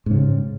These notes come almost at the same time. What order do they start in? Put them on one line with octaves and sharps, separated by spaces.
G#2 C#3 G3